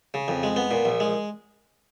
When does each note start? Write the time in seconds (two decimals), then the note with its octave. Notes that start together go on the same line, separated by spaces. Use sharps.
0.14 C#3
0.28 F2
0.43 G#3
0.56 B3
0.71 A#2
0.85 A#1
1.00 G#3